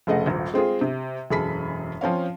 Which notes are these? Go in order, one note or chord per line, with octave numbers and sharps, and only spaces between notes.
F1 C#3 A3 G#4 D#5 F#5
D#1 G#1
G#3 C4 F4 G#4
C3
E1 F#2 G#4 A4 B5 B6
F3 C4 C#4 F5